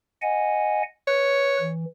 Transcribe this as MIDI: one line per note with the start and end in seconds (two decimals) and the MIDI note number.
0.22 0.83 75
0.22 0.83 78
0.22 0.83 80
1.08 1.57 71
1.08 1.69 73
1.60 1.85 52